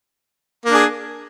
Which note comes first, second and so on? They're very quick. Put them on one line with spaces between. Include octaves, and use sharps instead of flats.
A#3 D4 G#4